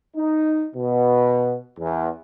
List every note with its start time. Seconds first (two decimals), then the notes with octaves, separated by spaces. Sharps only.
0.17 D#4
0.75 B2
1.79 E2